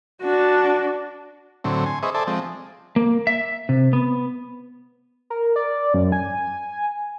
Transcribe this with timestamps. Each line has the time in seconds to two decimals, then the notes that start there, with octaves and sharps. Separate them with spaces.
0.22 D4 F#4
1.64 A2 D3 F#3 C4
1.86 G#5 C6
2.03 G#4 B4 C5 D#5 E5 C#6
2.14 A4 C5 D5 E5 G#5 A5
2.27 F3 G#3 C4
2.96 A#3
3.27 E5
3.69 C3
3.93 B3
5.30 A#4
5.56 D5
5.94 F#2
6.12 G#5